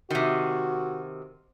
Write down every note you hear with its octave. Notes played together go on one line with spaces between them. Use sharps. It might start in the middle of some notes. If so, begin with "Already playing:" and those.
C3 D#3 F#4